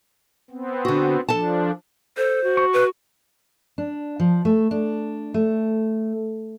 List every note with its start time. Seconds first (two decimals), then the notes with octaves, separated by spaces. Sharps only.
0.50 B3 C4
0.85 D3 F#4
1.29 F3 D4 A4 A5
2.17 A4 C5
2.44 F#4
2.57 C#6
2.73 B4
3.78 D4
4.20 F3
4.45 A3
4.71 D4
5.34 A3